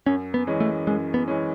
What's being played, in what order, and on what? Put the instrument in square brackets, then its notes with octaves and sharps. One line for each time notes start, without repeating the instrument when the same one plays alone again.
[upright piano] F#2 [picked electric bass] C#4
[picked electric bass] B3
[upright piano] E3 G#3 C#4
[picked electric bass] A3
[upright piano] F#2 [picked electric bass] G#3
[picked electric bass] B3
[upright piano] E3 G#3 C#4